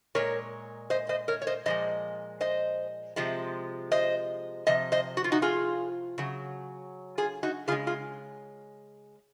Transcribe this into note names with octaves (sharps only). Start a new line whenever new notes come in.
A#2 G#3 A#4 C#5
C5 D#5
C5 D#5
A#4 C#5
C#5
C5 D#5
A#2 F3 G#3 C5 D#5
C5 D#5
C3 F3 G#3
C5 D#5
C3 F3 D#5
C5 D#5
F#4
F4
D#4 F#4
F4 G#4
C#3 F#3
F4 G#4
D#4 F#4
C#3 G#3 F4 G#4
F4 G#4